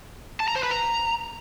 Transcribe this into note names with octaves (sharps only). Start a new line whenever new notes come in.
A5
A#5
C5
B4
A#5